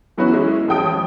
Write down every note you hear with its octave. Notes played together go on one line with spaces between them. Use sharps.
E3 F#3 B3 C#4 E4 F#4
E3 G#3 C#4 E4
A1 F2 G#3 G5 D#6 D7